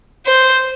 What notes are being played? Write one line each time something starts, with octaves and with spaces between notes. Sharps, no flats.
C5